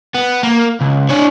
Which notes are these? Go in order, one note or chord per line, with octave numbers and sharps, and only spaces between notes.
B3
A#3
C#2
D4 C#5